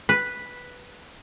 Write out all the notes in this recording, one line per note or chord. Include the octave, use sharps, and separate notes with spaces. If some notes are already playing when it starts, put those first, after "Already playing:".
B4